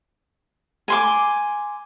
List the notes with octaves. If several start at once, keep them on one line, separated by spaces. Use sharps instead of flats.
G#5 C6 D6